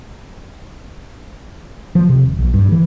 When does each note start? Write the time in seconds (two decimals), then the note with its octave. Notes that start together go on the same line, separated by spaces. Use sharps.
1.95 F3
2.09 C3
2.23 D#1
2.38 A#1
2.54 G2
2.72 E3